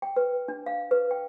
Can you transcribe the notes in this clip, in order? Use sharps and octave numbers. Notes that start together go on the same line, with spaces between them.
G5
B4
D4
F5
B4
G5